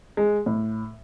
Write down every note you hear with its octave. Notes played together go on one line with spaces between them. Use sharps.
G#3
A2